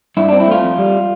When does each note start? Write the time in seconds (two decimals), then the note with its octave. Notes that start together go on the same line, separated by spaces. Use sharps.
0.17 G2 E4
0.29 C4 D4
0.40 E4
0.48 A3 F4
0.63 F2
0.78 G3